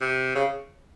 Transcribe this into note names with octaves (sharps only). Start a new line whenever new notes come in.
C3
C#3